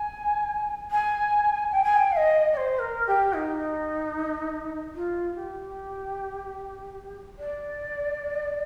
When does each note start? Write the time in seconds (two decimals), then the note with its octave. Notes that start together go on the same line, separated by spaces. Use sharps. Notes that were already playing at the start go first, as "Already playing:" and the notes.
Already playing: G#5
0.90 G#5
1.71 G5
1.83 G#5
1.96 G5
2.11 F5
2.16 D#5
2.52 D5
2.57 C5
2.79 A#4
3.07 G4
3.33 D#4
4.95 F4
5.35 G4
7.38 D5